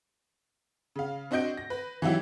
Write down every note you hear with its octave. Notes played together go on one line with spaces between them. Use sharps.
C#3 F5
C4 D4 F#4 D#5 G6 D7
A#6
B4
E3 F#3 D#4 E4 G4